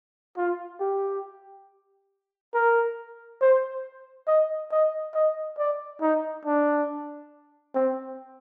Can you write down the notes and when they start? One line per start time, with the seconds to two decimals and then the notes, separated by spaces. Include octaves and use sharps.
0.37 F4
0.80 G4
2.54 A#4
3.41 C5
4.27 D#5
4.71 D#5
5.14 D#5
5.58 D5
6.01 D#4
6.45 D4
7.75 C4